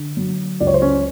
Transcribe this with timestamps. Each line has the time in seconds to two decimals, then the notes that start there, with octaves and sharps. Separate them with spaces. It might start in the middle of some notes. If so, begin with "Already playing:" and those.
Already playing: D3
0.17 F#3
0.60 C#2 D5
0.67 C#5
0.74 C5
0.82 C#4 C#5